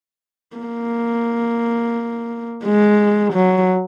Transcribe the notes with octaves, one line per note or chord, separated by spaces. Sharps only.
A#3
G#3
F#3